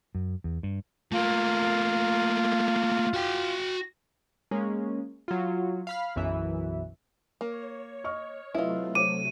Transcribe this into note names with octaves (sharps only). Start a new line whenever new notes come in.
F#2
E2
G2
A3 A#3 F4
F#4 G5
G#3 A#3 C#4
F#3 F4
F5 B5 F6
B1 F#2 E3 E5
A#3 C#5
D#5 C#6 F6
C3 F#3 A3 E4 F4 B4 D#5
C5 C#5 D6 D#7